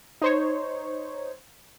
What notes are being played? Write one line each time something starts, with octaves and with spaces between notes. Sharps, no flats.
D#4 C5 C#5